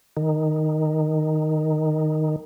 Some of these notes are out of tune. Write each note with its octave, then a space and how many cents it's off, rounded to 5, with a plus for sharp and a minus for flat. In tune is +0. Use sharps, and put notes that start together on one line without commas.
D#3 -5